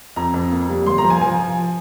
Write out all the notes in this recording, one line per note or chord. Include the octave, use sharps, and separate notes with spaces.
F2 A#5
F2
A#3
G3
G1 C6
A#5
F3
G#5
F3 G#5
F3